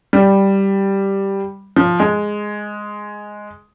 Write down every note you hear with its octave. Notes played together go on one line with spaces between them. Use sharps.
G3
F3
G#3